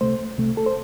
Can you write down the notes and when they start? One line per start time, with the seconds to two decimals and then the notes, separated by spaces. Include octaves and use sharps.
0.01 C2 C3 A3 C5
0.38 C2 C3 A3
0.57 A4
0.66 C5